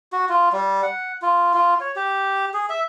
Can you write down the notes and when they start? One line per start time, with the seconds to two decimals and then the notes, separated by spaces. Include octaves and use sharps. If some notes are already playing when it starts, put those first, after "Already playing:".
0.13 F#4
0.29 F4
0.53 G3
0.83 F#5
1.22 F4
1.54 F4
1.80 C#5
1.96 G4
2.54 G#4
2.70 E5